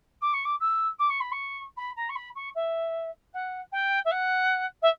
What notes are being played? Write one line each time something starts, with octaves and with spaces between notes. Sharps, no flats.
D6
C#6
D6
E6
D6
C#6
B5
C#6
B5
A#5
C#6
B5
C#6
E5
F#5
G5
E5
F#5
E5